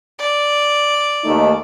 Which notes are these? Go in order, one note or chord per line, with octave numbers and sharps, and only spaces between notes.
D5
D#2 A3 D#4